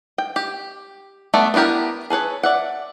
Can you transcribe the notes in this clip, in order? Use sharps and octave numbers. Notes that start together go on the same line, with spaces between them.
G5
G4
A3 B3 D5 E5 B5
B3 D4 E4 G4 A#4
G#4 A4 B4 C#5
D5 E5 F#5